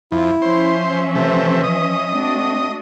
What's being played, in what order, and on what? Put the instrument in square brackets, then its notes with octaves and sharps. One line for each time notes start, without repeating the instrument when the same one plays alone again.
[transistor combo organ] F2 [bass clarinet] E4
[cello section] F3 C#4 E5 [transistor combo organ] C5
[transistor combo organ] C3 A3 [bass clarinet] E3
[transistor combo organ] D#5
[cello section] A3 D4 F#4 [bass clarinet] C4